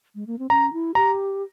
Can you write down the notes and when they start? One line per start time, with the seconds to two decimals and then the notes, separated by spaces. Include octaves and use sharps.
0.15 G#3
0.27 A#3
0.39 C4
0.50 C#4 A#5
0.73 E4
0.95 G4 A#5